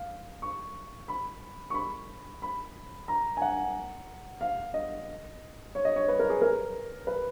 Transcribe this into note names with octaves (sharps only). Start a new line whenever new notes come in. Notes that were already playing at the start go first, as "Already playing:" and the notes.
Already playing: F5
C#6
B5
C#6
B5
B5
A#5
G#5
F#5
F5
D#5
C#5
D#5
C#5
B4
A#4
G#4
A#4
B4